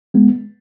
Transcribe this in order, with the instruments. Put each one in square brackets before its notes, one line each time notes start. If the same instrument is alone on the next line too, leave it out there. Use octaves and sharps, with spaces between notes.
[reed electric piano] G#3 B3